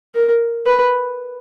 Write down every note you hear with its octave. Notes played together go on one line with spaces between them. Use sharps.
A#4
B4